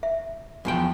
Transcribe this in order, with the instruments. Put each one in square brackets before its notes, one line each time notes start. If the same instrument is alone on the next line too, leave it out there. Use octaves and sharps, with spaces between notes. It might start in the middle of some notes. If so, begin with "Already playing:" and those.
[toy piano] E5
[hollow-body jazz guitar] E2 F3 G5